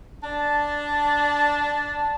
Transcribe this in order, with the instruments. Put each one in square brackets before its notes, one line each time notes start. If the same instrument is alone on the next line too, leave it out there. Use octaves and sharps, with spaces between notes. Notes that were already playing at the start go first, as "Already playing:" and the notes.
[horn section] D4 A5